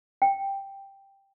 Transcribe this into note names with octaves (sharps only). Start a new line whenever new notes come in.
G5